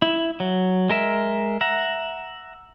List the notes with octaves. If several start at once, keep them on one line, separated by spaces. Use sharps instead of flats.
E4
F#3
G#3 A#4 E5
E5 F#5 A#5